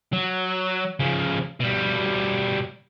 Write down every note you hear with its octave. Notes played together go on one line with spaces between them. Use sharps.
F#3
C#3 F3
B2 G3